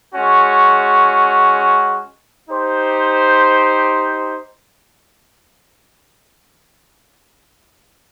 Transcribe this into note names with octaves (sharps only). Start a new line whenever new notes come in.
G#3 C#4 F#4
D#4 G4 C5